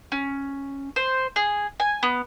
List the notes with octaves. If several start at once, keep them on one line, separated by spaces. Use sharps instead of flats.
C#4
C5
G#4
G#5
B3